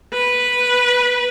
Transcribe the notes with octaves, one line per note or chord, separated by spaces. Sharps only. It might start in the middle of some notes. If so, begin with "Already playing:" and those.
B4